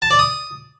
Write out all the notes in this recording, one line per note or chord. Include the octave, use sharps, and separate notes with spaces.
A5
D5
D#6